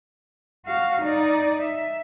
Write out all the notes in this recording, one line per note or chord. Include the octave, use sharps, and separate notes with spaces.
F#4 F5
D#4 D5
E5